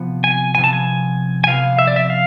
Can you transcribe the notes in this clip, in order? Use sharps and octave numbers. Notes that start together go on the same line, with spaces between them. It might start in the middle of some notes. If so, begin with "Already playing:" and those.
Already playing: C3 F3 B3
G#5
C3 F3 B3 G#5
A5
G#5
G#5
C3 F3 B3 F5
E5
D5
E5
F5